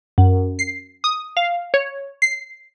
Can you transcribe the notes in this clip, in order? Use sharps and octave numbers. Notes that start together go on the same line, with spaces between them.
F#2
C7
D#6
F5
C#5
C7